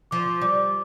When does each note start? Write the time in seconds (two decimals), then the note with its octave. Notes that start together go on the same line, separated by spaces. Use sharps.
0.11 F3 D6
0.41 G3 D6